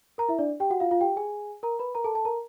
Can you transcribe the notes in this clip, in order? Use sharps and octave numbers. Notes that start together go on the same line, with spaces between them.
A#4 A#5
E4 E5
D4 D5
G4 G5
F#4 F#5
F4 F5
F4 F5
G4 G5
G#4 G#5
A#4 A#5
B4 B5
A#4 A#5
A4 A5
A4 A5
A#4 A#5